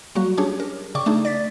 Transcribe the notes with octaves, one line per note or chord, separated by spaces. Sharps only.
F#3 G3 A#3 F#4
C#4 D4 G4 G#4 C#5
A#4
C#3 D5 G5 C#6 D6
A3 D4 D#4 G#4
D5 A6 B6